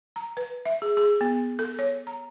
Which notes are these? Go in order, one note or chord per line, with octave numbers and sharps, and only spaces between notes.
A#5
B4
E5
G#4
G#4
B3
A4
C#5
A#5